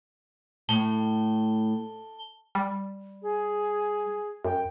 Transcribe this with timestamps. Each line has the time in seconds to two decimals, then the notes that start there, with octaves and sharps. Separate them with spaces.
0.69 A2 A5 G7
2.55 G3
3.22 G#4
4.45 F#2 G5